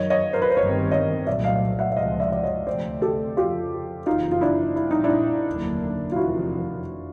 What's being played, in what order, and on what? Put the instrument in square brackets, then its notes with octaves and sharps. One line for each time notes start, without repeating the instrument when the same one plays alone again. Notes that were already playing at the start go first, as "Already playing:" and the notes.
Already playing: [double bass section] F#2 D#3 F#3 [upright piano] C#5 D#5
[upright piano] C#5 D#5
A#4 C5
B4
C5
[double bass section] G1 G2 D#3 G3 C4 [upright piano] B4 C#5
[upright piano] C#5 D#5
[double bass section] C2 A#2 F#3 A3 [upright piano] D5 E5
[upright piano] D#5 F5
E5 F#5
E5
[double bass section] C#2 C3 F3 G#3 [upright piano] D#5 F5
[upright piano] D5 E5
D5
C#5 D#5
[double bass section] D2 C3 F3 A3 C4 [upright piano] C5 D5
[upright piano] G4 A4
[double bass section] F2 C#3 F3 [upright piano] F4 G4
[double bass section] F#1 F2 C#3 E3 [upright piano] D#4 F4
[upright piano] F4
D4 E4
[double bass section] A#1 A#2 G3 C4 [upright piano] E4
[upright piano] D#4
D4 E4
[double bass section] F1 D#2 D3 F#3 A#3
[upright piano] F4
[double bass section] F1 E2 C3 D#3 [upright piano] E4 F#4